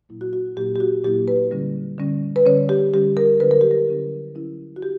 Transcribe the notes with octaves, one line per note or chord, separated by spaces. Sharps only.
A#2 F#3 A#3 E4
F#4
F#4
A#2 F#3 A#3 E4 G4
G4
F#4
A#2 F#3 A#3 E4 G4
B4
D3 G3 C#4
D3 G3 C#4
B4
D3 G3 C#4 C#5
G4
D3 G3 C#4 G4
A#4
D3 F#3 C#4 E4 B4
A#4
G4
A#4
D3 F#3 C#4 E4
D3 F#3 C#4 E4
F#4
G4